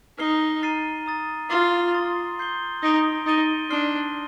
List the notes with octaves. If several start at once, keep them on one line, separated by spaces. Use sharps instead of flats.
D#4 F6 C7 G7
A#5 F6 A6 C7 D#7
A#5 D#6 A6
F4 D6 A6 C7 G7
C6 D#6 A6
C6 G6 C7 G7
D#4 D#6 A#6 D7 G7
D#4 D#6 A6 D#7 G7
D4 C6 F6 C7 G7